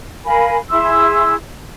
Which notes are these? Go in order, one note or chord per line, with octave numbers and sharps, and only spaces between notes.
A#4 F5 G#5 B5
E4 G#4 C6 E6